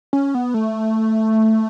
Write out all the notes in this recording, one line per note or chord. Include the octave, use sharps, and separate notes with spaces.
C#4
B3
A3